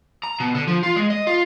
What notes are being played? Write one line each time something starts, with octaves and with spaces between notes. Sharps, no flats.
A#5
B2
D3
F3
F4
G#3
D#5
F4